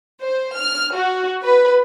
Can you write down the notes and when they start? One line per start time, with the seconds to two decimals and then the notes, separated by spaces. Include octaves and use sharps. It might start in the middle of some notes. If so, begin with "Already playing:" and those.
0.21 C5
0.56 F6
0.96 F#4
1.43 B4